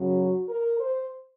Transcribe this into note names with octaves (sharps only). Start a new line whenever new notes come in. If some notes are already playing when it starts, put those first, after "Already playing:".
Already playing: F#2 C#3 F#3
F#4
A#4
C5